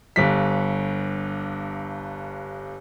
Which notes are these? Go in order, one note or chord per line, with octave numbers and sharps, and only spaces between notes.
G1 G2 B6